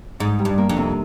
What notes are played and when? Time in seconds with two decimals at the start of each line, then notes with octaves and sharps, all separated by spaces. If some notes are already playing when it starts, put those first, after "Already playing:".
0.20 G#2 D#4
0.39 G3
0.45 G2
0.58 A#3
0.69 F2
0.77 C3